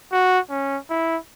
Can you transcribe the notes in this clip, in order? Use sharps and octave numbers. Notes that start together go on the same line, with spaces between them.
F#4
C#4
E4